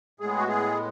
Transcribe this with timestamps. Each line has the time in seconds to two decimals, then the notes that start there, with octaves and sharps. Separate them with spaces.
0.20 A2 G#3 B3 G#4
0.37 F#4
0.48 G#4